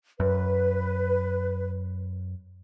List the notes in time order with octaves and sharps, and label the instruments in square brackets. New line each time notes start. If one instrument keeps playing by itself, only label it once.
[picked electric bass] F#2 [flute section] B4